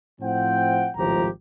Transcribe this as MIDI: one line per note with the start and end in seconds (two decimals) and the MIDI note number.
0.21 0.89 45
0.21 0.89 53
0.21 0.89 60
0.21 0.89 78
0.21 0.89 79
0.97 1.27 32
0.97 1.27 37
0.97 1.27 45
0.97 1.27 53
0.97 1.27 67
0.97 1.27 82